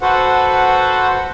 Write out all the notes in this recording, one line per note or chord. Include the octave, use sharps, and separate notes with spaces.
F#4 A4 B4 C5 F#5